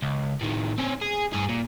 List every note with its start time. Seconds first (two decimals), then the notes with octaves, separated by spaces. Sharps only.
0.02 C#2
0.41 A2 D#3
0.78 C4 C#4
1.01 G#4
1.33 G2 G#4
1.49 A#2